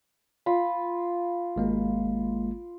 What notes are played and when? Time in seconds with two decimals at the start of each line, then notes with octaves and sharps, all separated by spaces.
0.46 F4 B5
1.56 G#1 G#3 A#3